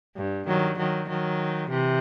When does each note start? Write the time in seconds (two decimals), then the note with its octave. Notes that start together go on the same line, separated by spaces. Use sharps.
0.16 G2
0.48 D#3 F#3
0.78 D#3 F#3
1.09 D#3 F#3
1.70 C3 E3